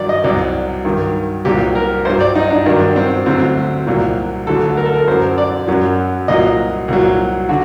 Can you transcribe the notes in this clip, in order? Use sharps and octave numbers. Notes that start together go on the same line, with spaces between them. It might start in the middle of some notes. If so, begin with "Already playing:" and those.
Already playing: G2 D#3 F#3 D5
D#5
C2 C3 F#3 D5
G2 D#3 F#3
C2 A#2 F#3 G4
A#4
G2 F#3 C5
D5
D#4
D4
G2 D#3 F#3 D4
C4
D2 C3 F#3 C4
C2 A#2 F#3
D2 D3 F#3 A4
A#4
A4
A#4
F#2 F#3 C5
D5
F#2 F#3
C2 A#2 F#3 D#5
C2 A#2 F#3
D3 F#4